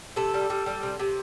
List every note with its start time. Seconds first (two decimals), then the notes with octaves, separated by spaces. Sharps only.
0.16 C3 A4
0.34 G3
0.50 G3
0.66 G3
0.83 C3
1.00 C3